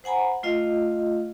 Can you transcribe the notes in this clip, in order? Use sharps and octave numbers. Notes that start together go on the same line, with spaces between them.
C5 F#5 G#5 A#5 B5
A3 F4 D#5 F5